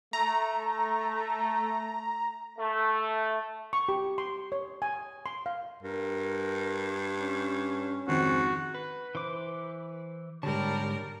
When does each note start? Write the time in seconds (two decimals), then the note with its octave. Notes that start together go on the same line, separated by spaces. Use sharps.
0.13 A3 A#5
2.59 A3
3.73 C#6
3.89 G4
4.18 C6
4.52 C#5
4.82 G#5
5.26 C6
5.46 F5
5.83 G2 A#4
7.19 C#4
8.08 F2 G#2 D#3 C4 F#4
8.74 B4
9.15 E3 C5 D6
10.43 G#2 D3 G3 A#4 C#5 A5